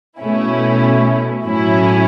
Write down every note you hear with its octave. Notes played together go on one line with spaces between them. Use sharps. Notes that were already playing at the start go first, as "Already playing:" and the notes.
B2 A3 C#4 E4
A2 F#3 C#4 E4